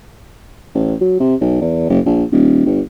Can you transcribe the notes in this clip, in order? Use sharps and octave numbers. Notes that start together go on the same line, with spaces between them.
A1
F#3
C3
B1
E2
F#1
A#1
D#1
G1